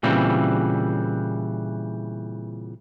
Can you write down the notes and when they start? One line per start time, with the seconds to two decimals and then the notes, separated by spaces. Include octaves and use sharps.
0.03 A#2 C#3 E3 G3 C4